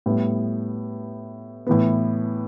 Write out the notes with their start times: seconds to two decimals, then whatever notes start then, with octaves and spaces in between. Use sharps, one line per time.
0.06 A2 G3 B3
1.67 A2 E3 B3